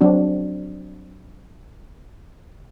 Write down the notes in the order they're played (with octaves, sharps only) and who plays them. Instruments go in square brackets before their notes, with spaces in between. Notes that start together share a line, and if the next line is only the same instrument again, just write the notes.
[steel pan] F#3 C4 D4 F#4